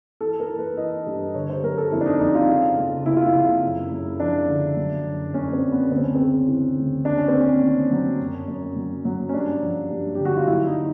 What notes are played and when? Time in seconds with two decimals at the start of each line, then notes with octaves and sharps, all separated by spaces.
0.21 E3 A4
0.40 A#4
0.49 E3
0.59 B4
0.77 E3 D#5
1.06 G2
1.34 D3 C#5
1.49 C5
1.63 F#3 A#4
1.78 A4
1.92 F2 E4
2.01 D4
2.06 D#4
2.20 F2 D#4
2.35 F4
2.49 C#3
2.77 C#2
3.06 C#2 E4
3.16 F4
3.26 E4
3.34 C#2
3.63 F#2
3.91 F#2
4.20 F3 D4
4.48 D3
4.76 F#3
5.05 F#2
5.34 F#2 C#4
5.53 C4
5.63 F#2
5.72 B3
5.91 D2 C4
6.03 C#4
6.15 C#3 C4
6.48 E3
6.77 D2
7.05 D#2 D4
7.17 C#4
7.28 C4
7.34 D#2
7.40 C#4
7.62 D#3
7.91 F#3
8.19 F#2
8.48 F#2
8.76 F#3
9.05 F#3
9.29 C#4
9.33 G2 D4
9.62 F3
9.91 G2
10.15 D3 G4
10.25 F#4
10.37 F4
10.47 F#3 E4
10.67 D#4